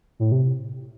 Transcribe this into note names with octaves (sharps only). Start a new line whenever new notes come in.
A2
C3